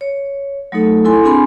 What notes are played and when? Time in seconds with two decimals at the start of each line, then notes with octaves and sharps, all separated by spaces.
0.01 C#5
0.72 F#3 A3 D#4 A4
1.05 E4 A4 G#5 C6
1.23 C4 D4 G#4 G#5 B5 C6